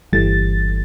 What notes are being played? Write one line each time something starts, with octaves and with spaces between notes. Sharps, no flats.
G1 E3 G3 A3 A6